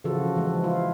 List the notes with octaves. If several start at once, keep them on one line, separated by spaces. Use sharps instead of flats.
C#3 E3 F3 F4 F#4 A4
E3 F3 G#3
E4 F4